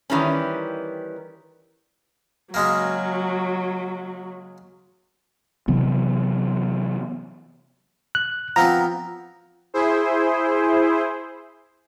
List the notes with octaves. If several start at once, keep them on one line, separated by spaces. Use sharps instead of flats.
D#3 E3 G3 C#4
C#3 F#3 G#3 A#3
C3 E3 F#3 B3
F#6
F3 B3 C4 A#5
E4 G#4 C5